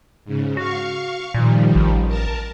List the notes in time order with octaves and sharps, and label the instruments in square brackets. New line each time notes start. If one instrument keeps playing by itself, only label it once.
[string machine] G#2 C#3
[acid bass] F#4 [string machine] F5 C#6
[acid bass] A#2 [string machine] D#3 F3 G3
[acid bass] A1
[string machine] A#4 A5